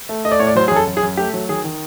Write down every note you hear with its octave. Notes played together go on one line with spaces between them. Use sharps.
A3
A3 D#5
D5
A2 C#5
D5
F#3 C5
G#4
F#2 A4
F#2
G#4
F#2
A3 G4
F#3
D#3 G#4
D#3